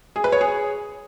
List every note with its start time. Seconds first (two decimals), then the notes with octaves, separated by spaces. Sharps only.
0.16 G#4
0.24 B4
0.32 C#5
0.41 G#4